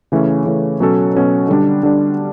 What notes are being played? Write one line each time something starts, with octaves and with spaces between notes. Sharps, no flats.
C#3 E3 A3 C#4
C#3 E3 A3 C#4
B2 F#3 C#4 F#4 A4
B2 F#3 C#4 F#4 A4
D3 G3 D4
D3 G3 D4